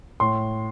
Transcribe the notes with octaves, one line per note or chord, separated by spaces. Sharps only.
A2 C6